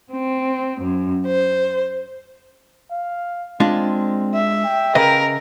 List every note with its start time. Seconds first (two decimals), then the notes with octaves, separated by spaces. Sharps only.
0.12 C4
0.82 F#2
1.26 C5
2.91 F5
3.60 G#3 C4 D4 F4
4.34 E5
4.64 G5
4.95 C#3 A#4 B4 D#5